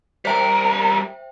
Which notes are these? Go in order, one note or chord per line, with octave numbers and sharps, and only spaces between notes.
G3 A#4 C5 E5 G5